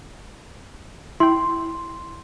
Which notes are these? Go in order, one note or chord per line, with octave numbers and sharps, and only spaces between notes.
E4 G5 C6